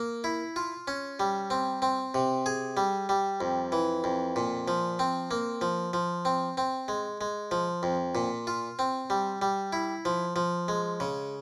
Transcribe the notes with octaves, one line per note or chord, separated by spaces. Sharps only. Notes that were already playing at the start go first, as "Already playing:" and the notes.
Already playing: A#3
E4
F4
C#4
G3
C4
C4
C3
G#4
G3
G3
F2
E3
F2
A#2
F3
C4
A#3
F3
F3
C4
C4
G#3
G#3
F3
F2
A#2
F4
C4
G3
G3
E4
F3
F3
G#3
C#3